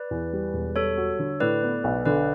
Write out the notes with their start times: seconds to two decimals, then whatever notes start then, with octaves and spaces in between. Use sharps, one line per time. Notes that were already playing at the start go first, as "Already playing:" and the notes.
Already playing: B4 D5
0.11 E2
0.33 G3
0.54 E1
0.76 G3 A4 C#5
0.97 F#4
1.19 D3
1.40 A2 B4 D5
1.63 B3
1.84 B1
2.05 D3 B4 D5